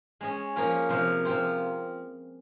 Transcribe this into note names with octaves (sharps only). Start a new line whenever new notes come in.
G#3 C#4 G#4
F3 A#3 C#4 F4
C3 F3 A#3 F4 C5
C3 F3 C4 F4 C5